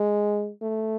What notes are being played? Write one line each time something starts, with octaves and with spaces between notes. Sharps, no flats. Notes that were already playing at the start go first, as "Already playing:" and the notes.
Already playing: G#3
A3